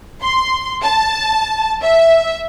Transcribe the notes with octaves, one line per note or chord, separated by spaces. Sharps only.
C6
A5
E5